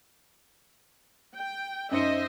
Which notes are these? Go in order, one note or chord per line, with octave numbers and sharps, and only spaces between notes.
G5
F#2 D#4 C5 D#5 E5 C#7